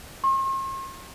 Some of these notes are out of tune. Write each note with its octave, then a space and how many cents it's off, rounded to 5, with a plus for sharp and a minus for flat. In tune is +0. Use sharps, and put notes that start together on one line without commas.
C6 +45